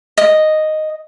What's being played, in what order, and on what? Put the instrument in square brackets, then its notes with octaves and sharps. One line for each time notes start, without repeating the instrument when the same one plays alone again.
[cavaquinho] D#5